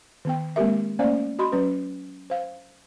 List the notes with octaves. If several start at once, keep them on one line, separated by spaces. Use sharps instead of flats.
D#3 B3 G5
G#3 A#3 C4 G4 A#4 E5
A3 A#3 C#4 C5 D5 F5
F#4 D#5 B5 C6
F#3 C#4 B4
C5 F5